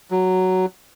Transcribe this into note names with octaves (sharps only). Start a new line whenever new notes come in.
F#3